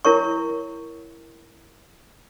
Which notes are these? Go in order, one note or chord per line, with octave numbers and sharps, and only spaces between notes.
E4 A#4 C#5 C#6